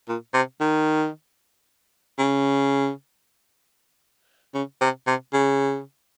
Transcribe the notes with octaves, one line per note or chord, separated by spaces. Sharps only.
A#2
C3
D#3
C#3
C#3
C3
C3
C#3